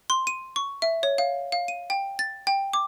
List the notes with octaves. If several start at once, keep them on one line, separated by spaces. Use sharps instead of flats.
C6
D#7
C#6
E5
C#5
F5
F5
D#7
G5
A6
G5
D6